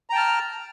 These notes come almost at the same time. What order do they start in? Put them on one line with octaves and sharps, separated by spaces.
A#5 G5 A5 F6